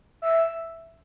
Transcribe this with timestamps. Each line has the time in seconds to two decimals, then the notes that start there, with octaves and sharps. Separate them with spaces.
0.22 E5